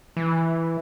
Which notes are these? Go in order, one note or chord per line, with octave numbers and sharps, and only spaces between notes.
E3